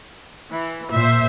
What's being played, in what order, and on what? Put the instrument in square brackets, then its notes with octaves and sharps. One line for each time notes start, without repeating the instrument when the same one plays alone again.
[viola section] E3
[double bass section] A#2 [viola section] C5 E5